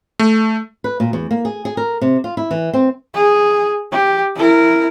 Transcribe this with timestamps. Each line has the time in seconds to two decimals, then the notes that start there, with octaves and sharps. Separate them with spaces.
0.19 A3
0.84 B4
1.00 A#2
1.13 E2
1.31 A#3
1.45 G#4
1.65 G#4
1.77 A#4
2.01 C3
2.24 F4
2.37 E4
2.51 E3
2.74 C4
3.14 G#4
3.92 G4
4.35 E4 A#4